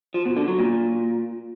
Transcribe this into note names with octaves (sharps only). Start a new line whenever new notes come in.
F3
B2
D3
F#3
A#2